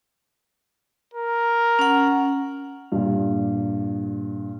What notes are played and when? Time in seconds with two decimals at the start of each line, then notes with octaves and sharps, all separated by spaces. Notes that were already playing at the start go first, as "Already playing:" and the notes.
1.14 A#4
1.79 C#4 F#5
2.92 G2 A#2